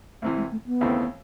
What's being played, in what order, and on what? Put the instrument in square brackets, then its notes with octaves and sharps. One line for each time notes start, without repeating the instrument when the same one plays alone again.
[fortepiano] C2 C3 E3 [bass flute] A3
[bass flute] G#3
A3
B3
[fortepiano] D#2 C#3 E3 A3 C4